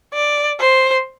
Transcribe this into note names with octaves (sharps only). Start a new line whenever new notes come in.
D5
C5